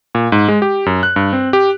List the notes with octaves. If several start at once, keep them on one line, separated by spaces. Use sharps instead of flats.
A#2
G#2
G#3
G4
F#2
F#6
G2
C4
G4